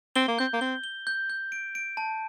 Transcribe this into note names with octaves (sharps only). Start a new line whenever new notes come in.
C4 G7
A#3
C4 G6
A#3
C4 G7
G7
G6
G6
D7
D7
A5